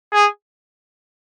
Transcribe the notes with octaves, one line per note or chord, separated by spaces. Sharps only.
G#4